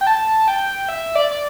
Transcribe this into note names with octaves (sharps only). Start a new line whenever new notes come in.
G5
A5
G5
E5
D5
D5